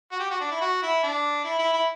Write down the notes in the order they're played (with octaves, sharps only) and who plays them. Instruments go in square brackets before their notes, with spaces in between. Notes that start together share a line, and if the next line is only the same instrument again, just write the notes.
[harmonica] F#4
G4
F#4
D4
E4
F#4
E4
D4
E4
E4
E4